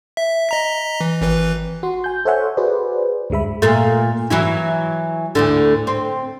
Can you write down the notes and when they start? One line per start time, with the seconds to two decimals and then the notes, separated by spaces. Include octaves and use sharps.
0.17 E5
0.49 D#5 A#5 B6
1.01 E3
1.21 G#1 E3 B4
1.83 F#4 C6
2.04 G#5 G6
2.25 A4 C5 C#5 E5 F#5 G#5
2.57 F#4 G#4 B4 C5 D5
3.30 D2 G2 G#3 E5 B5
3.62 A#2 A3
4.31 E3 F#3 E4
5.35 D2 A2 D3
5.87 C4